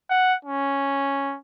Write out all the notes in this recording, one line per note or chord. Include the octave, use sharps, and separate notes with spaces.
F#5
C#4